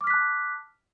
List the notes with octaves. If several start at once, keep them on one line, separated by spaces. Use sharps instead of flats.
A5 D6 F6 F#6 B6